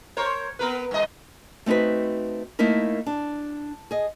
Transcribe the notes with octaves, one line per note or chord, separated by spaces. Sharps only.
A#4 C5 C#5
B3 A#4 B4
G2 D#5
A3 C4 D#4 F#4 B4
A3 A#3 D#4 E4 A#4
D4
G#4 D#5